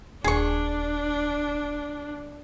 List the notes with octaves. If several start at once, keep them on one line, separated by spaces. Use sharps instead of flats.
D#1 D4 G#4 C#6